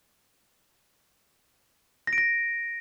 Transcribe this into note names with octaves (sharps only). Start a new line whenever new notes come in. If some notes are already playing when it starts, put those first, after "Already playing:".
A#6
D7
A#6